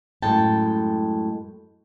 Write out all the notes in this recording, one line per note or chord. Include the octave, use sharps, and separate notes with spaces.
F#2 A2 G#3 G5 A5